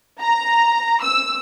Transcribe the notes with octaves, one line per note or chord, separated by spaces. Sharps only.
A#5
E6